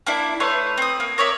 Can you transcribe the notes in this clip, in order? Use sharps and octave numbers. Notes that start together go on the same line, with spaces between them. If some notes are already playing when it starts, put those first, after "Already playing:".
A#3 D4 E4
A3 B4 C#5 C6
C4 D#6
A#3
A#4 C#5 D5 E5